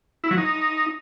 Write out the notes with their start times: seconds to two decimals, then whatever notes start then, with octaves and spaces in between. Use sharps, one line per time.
0.24 E4
0.31 F#3
0.38 D#4